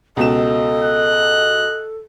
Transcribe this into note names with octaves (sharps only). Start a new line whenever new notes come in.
C#2 B2 A4 D#5 E7
F#6